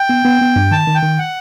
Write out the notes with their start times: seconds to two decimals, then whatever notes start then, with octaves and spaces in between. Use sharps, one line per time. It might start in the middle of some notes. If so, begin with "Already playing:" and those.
Already playing: G5
0.09 B3
0.25 B3
0.41 B3
0.56 G2
0.71 D#3 A5
0.87 D#3
0.95 G5
1.03 D#3
1.18 F#5